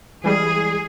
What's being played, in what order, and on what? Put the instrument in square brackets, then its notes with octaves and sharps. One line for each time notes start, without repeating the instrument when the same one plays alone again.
[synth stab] E3 G3 G#3 [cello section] G#4